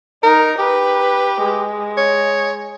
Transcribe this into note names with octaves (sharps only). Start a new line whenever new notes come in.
D#4 A#4
G4 B4
G#3
C#5